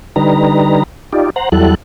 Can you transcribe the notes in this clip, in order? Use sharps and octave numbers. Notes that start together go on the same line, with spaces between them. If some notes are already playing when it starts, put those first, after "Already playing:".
D3 G3 D#4 B4 A#5
D#4 F4 G4 D5
C5 F#5 A#5
E2 F#3 G3 E4 A4 F#6